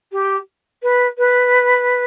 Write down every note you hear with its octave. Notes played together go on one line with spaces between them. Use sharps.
G4
B4
B4